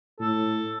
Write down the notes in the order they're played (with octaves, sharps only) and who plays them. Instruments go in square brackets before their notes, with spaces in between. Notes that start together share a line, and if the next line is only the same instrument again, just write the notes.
[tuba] A2 [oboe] A4